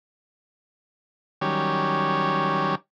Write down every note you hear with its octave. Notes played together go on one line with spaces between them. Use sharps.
D#3 F#3 G3 C#4 G4 C#5